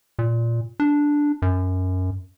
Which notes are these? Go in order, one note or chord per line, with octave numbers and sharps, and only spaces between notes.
A#2
D4
F#2